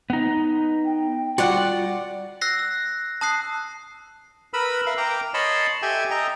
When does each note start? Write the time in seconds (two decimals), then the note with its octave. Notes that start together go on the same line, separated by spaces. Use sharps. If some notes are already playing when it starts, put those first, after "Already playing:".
0.10 B3 D#4
0.85 G5
1.38 G3 F4 F#4 D5 F#5
2.41 E6 F#6 A#6 C7
2.59 E6
3.21 A5 D#6 F#6 C7
4.54 A#4 B4 B5 E6
4.86 A#4 B4 E5 F5
4.97 A#4 G5 A#5 D6
5.34 C#5 D#5 A5 B5 C6
5.82 G4 A4 E5 G5 G#5
6.11 A4 D#5 G5 A#5